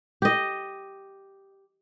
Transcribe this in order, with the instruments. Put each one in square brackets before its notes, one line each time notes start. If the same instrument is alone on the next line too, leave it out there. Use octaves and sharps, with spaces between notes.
[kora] G4 D#5